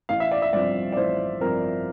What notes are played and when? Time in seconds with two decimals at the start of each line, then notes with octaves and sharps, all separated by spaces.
0.09 A1 F5
0.20 E5
0.32 D5
0.42 E5
0.53 G2 F3 C4 D5
0.92 D5
0.97 A1 C5
1.41 G2 F3 C4 A#4